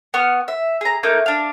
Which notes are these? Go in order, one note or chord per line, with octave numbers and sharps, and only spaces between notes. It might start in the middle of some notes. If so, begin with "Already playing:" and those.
B3 F#5 C#6 F6
E5
G#4 A#5
A3 A#3 D#4 G6
D4 F5